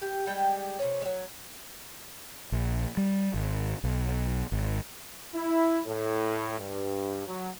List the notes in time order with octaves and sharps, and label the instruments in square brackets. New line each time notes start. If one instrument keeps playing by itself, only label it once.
[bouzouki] G4
G3 G#3 G5
C3 C#4
F#3 G#3
[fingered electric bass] A#1
G3
G#1
B1
G#1
[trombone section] E4
A2
G2
F#3